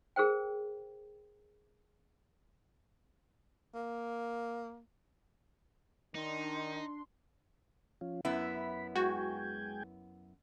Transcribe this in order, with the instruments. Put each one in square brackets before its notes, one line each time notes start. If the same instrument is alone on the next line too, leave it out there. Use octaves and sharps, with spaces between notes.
[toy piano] G#4 A#4 C5 G5
[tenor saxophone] A#3
[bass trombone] D#3 [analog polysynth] D4 C6 [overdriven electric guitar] D#4
[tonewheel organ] F3 C#4 F4
[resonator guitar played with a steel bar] F#2 B3 E4 [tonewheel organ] B5
[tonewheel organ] G#3 G5 G#5 [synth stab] F#4